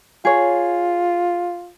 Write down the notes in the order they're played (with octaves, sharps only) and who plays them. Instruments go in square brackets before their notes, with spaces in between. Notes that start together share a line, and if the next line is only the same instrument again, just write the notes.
[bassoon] F4 [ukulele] G#4 C#5